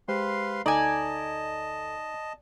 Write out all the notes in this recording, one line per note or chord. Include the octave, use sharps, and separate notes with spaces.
G#3 G4 B4 C5 F5 C6
D2 D#4 A4 D5 D#5 G#5 A5